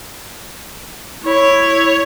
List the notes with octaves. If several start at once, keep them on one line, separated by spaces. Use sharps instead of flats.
E4 C#5